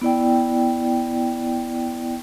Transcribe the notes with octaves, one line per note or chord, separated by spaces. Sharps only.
B3 E4 D5 G5